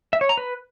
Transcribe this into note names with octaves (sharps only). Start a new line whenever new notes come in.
E5
C#5
A#5
B4